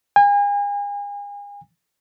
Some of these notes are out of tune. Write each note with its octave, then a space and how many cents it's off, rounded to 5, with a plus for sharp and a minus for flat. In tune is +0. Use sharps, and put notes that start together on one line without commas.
G#5 -40